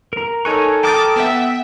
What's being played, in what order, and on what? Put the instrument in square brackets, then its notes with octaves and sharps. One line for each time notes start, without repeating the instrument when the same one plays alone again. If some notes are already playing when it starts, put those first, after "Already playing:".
[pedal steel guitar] A#4 A#5
[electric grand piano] D#4 A#4 F#6 [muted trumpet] A4 [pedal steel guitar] C#5 G#5 C#6
[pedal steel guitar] G5 A5 F6 [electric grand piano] A#5 D#6 A6 [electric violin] D6
[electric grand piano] B3 F#5 [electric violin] E5